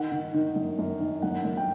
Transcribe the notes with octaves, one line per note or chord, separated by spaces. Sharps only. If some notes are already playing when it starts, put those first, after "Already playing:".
Already playing: D#3 F#5
D#3
D#3
F#2
F#2
D#3
F#2 F#5
F#2
G5